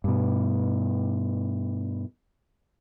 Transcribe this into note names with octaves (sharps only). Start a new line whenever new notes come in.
G2 B2